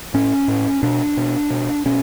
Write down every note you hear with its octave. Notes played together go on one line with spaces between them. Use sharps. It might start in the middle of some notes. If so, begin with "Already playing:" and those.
A2 C#4
A2
B2 D4
B2
B2
B2 C#4